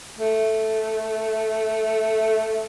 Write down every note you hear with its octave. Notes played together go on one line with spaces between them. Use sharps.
A3